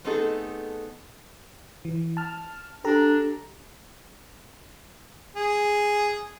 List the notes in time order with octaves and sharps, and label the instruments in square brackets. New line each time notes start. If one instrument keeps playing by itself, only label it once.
[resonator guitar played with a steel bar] A3 B3 C4 D#4 G#4 A4
[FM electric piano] E3
A5 F6
[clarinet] D4 [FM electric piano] G4 A4 A#5
[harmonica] G#4